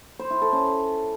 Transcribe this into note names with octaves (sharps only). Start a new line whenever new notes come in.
C5
E4
A4
C#4